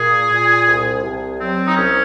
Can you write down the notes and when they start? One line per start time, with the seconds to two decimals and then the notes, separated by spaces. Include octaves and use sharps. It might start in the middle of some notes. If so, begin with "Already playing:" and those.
Already playing: A#2 G#4
0.30 A#2
0.66 C2
1.03 C2
1.39 F#3 C4
1.68 D#4
1.75 C2 C#4